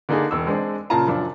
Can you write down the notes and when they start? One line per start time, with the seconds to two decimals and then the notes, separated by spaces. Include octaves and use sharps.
0.09 D3 A#3 D4 D#4 G#4
0.31 E1 E6
0.47 G#3 C4 D4
0.90 A#2 C#3 F4 A5 A#5
1.08 F#2 F3 D4